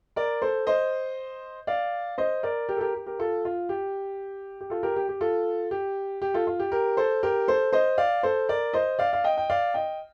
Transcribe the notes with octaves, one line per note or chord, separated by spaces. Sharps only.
A#4 D5
A4 C5
C5 D#5
D5 F5
C5 D#5
A#4 D5
G4 A#4
A4
G4 A#4
G4
G4 A#4
F4 A4
F4
G4
G4
F4 A4
G4 A#4
G4
G4
F4 A4
G4
G4
F4 A4
F4
G4
G4 A#4
A4 C5
G4 A#4
A4 C5
C5 D#5
D5 F5
A4 C5
A#4 D5
C5 D#5
D5 F5
F5
D#5 G5
G5
D5 F5
D#5 G5